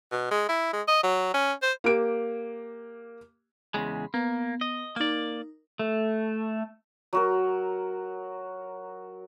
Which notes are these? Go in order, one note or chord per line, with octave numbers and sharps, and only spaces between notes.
B2
G#3
E4
G#3
D#5
F#3
C#4
C5
A#3 G4 D7
E2 C#3 G#3 B5 C6
A#3 B3
D#5
A#3 D#4 A#4 D5
A3
F#3 F#4 A#4